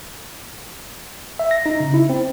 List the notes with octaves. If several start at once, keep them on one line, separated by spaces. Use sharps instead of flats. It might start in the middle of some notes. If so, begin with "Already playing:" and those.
E5
A#6
D#4
C#3
E4
C4